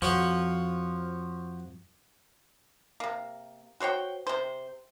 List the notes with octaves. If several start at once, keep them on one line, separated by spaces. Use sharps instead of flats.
F2 F3 F#4 C#5 C#6
C3 A#3
F#4 C5 C#5 G5
C3 C5